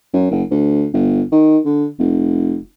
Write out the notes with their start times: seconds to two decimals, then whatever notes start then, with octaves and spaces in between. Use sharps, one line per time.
0.13 F#2
0.31 F#1
0.51 D2
0.93 G1
1.32 D#3
1.65 D3
1.99 F1